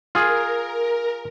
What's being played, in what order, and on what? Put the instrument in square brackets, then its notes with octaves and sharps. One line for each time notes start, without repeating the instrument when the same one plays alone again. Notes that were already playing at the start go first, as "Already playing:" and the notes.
[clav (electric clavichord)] F4 G#4 [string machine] A#4